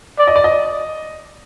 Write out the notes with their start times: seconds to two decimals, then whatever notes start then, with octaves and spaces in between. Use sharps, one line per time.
0.19 D5
0.27 D#5
0.36 D5
0.44 D#5